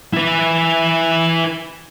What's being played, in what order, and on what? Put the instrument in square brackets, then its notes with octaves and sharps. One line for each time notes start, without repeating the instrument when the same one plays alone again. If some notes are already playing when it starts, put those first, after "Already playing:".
[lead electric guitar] E4 B4